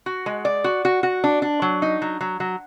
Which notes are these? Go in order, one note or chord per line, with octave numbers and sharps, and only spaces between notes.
F#4
G#3
D5
F#4
F#4
F#4
D4
D4
F#3
D#4
F#3
F#3
F#3